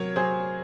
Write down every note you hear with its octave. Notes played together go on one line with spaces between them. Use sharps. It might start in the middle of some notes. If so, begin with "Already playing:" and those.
Already playing: C3 F#3 A#4 C#5
F#3 G#4 C5